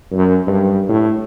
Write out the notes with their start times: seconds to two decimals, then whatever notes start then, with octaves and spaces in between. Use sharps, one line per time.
0.12 F#2
0.48 G2
0.89 A2